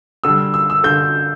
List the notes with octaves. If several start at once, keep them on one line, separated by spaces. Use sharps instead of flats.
D3 G3 E6
E6
E6
D3 G6